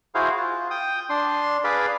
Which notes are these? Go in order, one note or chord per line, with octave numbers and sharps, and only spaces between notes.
E4 F#4 G#4 C5 F5
F4
G5 D#6
D4 C6
G#4 B4 D5 F5 B5